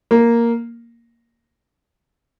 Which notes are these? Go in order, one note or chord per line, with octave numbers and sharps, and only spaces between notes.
A#3